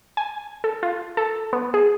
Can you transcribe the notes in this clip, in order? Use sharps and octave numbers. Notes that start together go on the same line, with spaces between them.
G#5
A4
F4
A4
B3
G#4